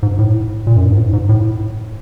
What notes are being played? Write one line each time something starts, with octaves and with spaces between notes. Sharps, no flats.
G#2
A2
A#2
F#2
G2
G#2
A2
G#2
A2